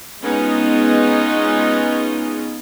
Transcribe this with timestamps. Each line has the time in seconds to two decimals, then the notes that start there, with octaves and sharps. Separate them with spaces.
0.23 G#3 B3 C#4 D#4 F4 D#5